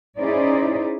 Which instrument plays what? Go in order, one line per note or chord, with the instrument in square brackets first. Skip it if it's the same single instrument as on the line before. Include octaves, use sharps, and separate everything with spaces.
[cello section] C#4 D#4 E4 G#4 C5 D5